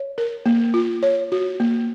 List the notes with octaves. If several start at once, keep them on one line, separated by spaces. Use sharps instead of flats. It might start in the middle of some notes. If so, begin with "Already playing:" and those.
Already playing: C#5
A#4
A#3
F4
C#5
F#4
A#3